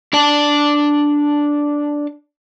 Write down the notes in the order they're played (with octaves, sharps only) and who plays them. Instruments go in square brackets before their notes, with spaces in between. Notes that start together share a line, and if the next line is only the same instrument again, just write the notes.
[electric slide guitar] D4 D5 A5